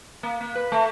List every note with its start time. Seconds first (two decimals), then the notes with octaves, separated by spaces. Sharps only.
0.23 A#3
0.40 A#3
0.55 B4
0.72 A3